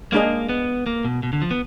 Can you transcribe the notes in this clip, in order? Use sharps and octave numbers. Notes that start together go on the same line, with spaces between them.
G#3 A#3 D4 G#4 D#5
B3
A#3
B2
B2
D3
F3
B3